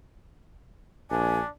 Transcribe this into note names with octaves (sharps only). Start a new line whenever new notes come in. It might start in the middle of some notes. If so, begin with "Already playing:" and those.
A#1 D4 G#5